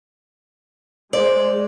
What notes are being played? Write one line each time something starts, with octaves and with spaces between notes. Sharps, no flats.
G#3 C5 D5